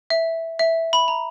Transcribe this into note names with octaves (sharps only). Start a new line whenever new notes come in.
E5
E5
B5
A#5